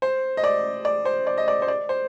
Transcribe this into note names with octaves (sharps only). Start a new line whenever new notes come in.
C5
D#5
D5
D5
C5
D5
D#5
D5
C5
D5
C5